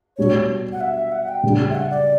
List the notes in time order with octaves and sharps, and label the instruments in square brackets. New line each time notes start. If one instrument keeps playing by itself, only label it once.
[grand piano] B2 G3 D4 [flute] C#5
[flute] F#5
E5
F#5
G5
[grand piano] C#3 G3 D4
[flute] E5
F#5
D5